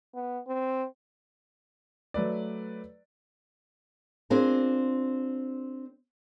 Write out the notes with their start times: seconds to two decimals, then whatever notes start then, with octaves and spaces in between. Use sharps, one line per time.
0.14 B3
0.47 C4
2.14 F#3 A3 B4 D5
4.30 C4 D4 F4 G#4 A#4